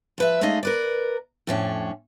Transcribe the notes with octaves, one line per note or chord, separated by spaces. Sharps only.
F3 B4 E5
G#3 A3 C#4 D#4 D#5 F5
A#4 B4 D5
F2 A2 C#4 D4